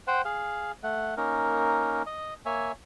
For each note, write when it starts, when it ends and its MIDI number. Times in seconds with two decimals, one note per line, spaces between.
0.08 0.22 72
0.08 0.22 78
0.08 0.22 79
0.25 0.72 68
0.25 0.72 77
0.83 1.15 57
0.83 1.15 78
1.17 2.02 58
1.17 2.02 61
1.17 2.02 63
1.17 2.02 70
2.06 2.34 75
2.46 2.72 58
2.46 2.72 73
2.46 2.72 76
2.46 2.72 80